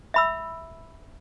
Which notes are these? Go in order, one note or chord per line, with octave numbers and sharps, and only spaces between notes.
E5 B5 E6